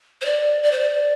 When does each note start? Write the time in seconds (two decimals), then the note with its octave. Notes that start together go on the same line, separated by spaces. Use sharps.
0.21 C5
0.25 D5
0.63 D5
0.72 C5
0.80 D5